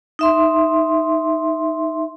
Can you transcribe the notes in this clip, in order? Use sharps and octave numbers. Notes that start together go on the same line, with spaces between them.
D#4 E5 C6